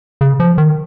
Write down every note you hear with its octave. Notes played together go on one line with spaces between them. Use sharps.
C#3
F3
D#3